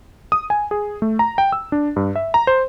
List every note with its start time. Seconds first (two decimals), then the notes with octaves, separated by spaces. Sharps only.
0.32 D#6
0.50 G#5
0.71 G#4
1.02 A3
1.19 A#5
1.38 G5
1.52 E6
1.72 D4
1.96 G2
2.16 E5
2.34 A#5
2.47 C5